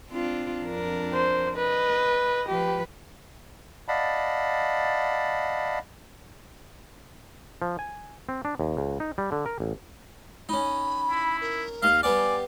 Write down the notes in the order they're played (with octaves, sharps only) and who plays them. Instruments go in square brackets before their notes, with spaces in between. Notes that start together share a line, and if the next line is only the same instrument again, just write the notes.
[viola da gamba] C4 D4 F4
F2 D4 A#4
[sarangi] C5
[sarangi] B4 [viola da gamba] D#5
[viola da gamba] F3 B4 [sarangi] G4
[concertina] D5 D#5 F5 F#5 A5 B5
[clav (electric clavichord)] F3
G#5
C4
D4
D#2
C#2
D#4
G3
D3
A#4
A1
[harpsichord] C#4 D#4 [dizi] B5
[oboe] E4
[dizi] A#4
[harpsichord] D#2 D#5 [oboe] F5
[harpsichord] G3 B3 F5 [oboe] D5 [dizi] G#5